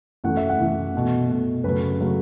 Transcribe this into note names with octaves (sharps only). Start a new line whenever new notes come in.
F#2 E3 A3 F#5
E5
F#5
F#2 E3 A3
B2 A3
B2 A3
F#2 C#3 F#3 A3 B4
C#3 F#3 A3